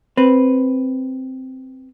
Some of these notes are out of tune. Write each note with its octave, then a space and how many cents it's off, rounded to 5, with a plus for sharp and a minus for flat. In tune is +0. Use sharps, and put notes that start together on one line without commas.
C4 +0 B4 +0